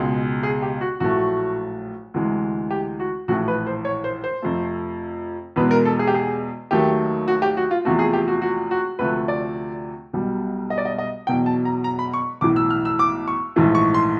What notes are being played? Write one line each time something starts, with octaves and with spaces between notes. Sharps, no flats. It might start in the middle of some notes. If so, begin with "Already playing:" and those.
Already playing: C#2 B2 G#3
G#4
G4
F#4
A#1 A2 F#3 A3 F#4
D2 C3 E3 G#3
G4
F#4
A#1 A2 E3 A3 F#4
B4
C5
C#5
C5
C5
F2 C3 F3 A3
E2 B2 G#3 B4
A#4
A4
G#4
G4
G#4
D#2 D#3 F#3 A3 G4
F#4
G4
F#4
F4
E2 C3 F3 A3 F#4
G#4
G4
F#4
F#4
F#4
D2 C3 F3 A3 B4
D5
B1 B2 G3
D#5
D5
D#5
D#5
E2 B2 F#3 G5
A5
A#5
A#5
B5
C#6
B1 A2 E3 D6
E6
F6
E6
D6
C#6
A#1 G#2 E3 A3
C#6
C6